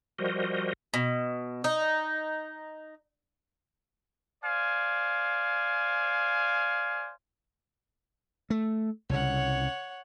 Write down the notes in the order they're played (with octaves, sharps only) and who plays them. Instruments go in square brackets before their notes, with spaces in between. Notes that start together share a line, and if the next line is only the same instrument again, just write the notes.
[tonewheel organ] F3 G3 F#4 A#4 C5 D#5
[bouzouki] B2
D#4
[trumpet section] C5 D5 F5 G#5
[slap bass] A3
[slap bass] C2 C#3 [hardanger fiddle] C#5 F#5